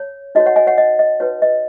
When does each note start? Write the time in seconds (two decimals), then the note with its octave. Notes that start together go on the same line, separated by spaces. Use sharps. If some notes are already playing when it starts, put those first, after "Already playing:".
Already playing: C#5
0.35 D#4 F#4 C#5 D#5
0.46 C#5 F#5
0.56 D#5 G#5
0.67 C#5 F#5
0.78 D#5
0.99 D#5
1.20 D#4 F#4 B4 C#5
1.42 D#5